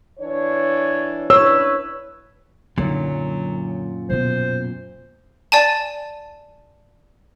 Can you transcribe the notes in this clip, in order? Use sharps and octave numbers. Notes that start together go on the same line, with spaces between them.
E3 D4 C#5
D4 E4 B4 C#5 E6
F#2 A#2 D3 F#3 D#4
B2 B3 C5
D5 G#5 A5